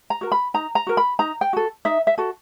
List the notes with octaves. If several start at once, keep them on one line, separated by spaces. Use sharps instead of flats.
A#5
F#4 A#4
B5
D#4 A#5
A#5
F#4 A#4
B5
D#4 A#5
G5
F#4 A4
D#4 E5
E5
F#4 A4